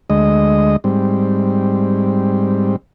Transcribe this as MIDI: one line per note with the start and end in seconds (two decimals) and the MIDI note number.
0.10 0.76 38
0.10 0.76 56
0.10 0.76 75
0.84 2.76 44
0.84 2.76 55
0.84 2.76 60